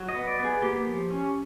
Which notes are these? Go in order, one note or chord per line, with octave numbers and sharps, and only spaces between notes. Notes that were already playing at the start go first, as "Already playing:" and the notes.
Already playing: F#3
D#5
B3
D5
B3 G#4
A#3 G4
F3
C#4